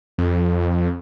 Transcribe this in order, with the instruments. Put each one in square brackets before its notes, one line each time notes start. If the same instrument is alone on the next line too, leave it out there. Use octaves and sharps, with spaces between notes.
[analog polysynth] F2